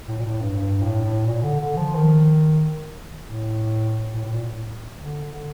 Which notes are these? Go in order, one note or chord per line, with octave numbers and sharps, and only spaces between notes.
A2
A#2
A2
G2
G2
A2
A2
A#2
D3
D3
F3
D#3
A2
A2
A2
A#2
A2
D3
D3